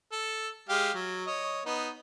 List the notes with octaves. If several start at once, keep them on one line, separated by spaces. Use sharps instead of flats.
A4
G#3 G4 F5
F#3
C#5 D#5
B3 D#4